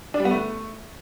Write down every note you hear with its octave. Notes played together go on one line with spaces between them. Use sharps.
D4
G3
B3
A3